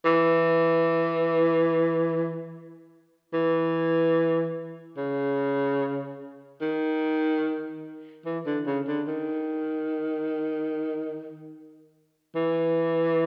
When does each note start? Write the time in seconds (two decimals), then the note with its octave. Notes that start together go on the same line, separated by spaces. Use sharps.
0.05 E3
3.33 E3
4.97 C#3
6.61 D#3
8.25 E3
8.46 D3
8.66 C#3
8.87 D3
9.08 D#3
12.35 E3